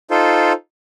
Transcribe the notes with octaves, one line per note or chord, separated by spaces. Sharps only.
D#4 F4 A4 C5